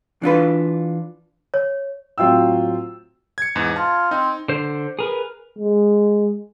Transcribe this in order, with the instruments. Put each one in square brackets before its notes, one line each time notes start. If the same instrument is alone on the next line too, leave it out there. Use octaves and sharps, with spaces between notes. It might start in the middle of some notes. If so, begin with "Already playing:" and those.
[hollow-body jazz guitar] E3 D4 F4 B4
[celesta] C#5
[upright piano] A2 F#3 C4 F4 G5 E6
[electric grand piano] G#6 C#7
E2 G#2
[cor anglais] F4 [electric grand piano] A5
[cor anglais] C4 [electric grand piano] D#4
[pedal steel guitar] D3 C5
G#4 A#4 B4
[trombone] G#3